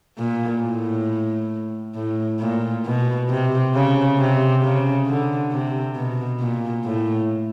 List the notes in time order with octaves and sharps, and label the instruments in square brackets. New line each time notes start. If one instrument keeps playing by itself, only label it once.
[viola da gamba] A#2
A2
A2
A#2
B2
C3
C#3
C3
C#3
D3
C3
B2
A#2
A2